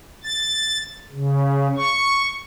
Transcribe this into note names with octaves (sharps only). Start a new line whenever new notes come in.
A6
C#3
C#6